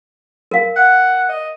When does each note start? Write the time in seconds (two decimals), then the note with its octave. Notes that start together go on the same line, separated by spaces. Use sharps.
0.51 A#4 F5
0.76 F#5
1.29 D#5